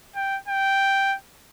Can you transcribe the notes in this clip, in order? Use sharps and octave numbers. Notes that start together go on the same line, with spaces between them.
G5
G5